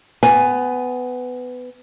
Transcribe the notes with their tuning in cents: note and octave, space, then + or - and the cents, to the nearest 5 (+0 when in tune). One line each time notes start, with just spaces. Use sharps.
B3 +20 G#5 -5